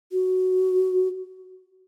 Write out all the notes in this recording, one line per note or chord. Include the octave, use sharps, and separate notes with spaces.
F#4